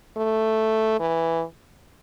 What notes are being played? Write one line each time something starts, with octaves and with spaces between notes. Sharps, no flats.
A3
E3